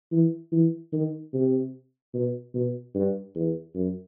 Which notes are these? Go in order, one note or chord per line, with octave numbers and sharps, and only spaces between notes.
E3
E3
D#3
C3
B2
B2
G2
E2
F#2